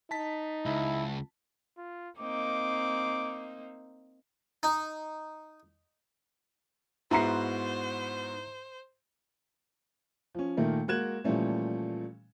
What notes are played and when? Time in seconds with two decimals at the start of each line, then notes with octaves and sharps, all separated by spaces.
0.11 D#4 A5 B6
0.66 C#2 E4
1.78 F4
2.19 A#3 C4 D#4 D6
4.63 D#4
7.11 G#2 B3 E4 F#4 C5 A#5 C7
10.35 F3 C#4
10.57 A#2 D#3 A3 A#3
10.88 G#3 A#3 F#4 F#6 G#6 E7
11.24 A#2 E3 F3 G3 A3 C#4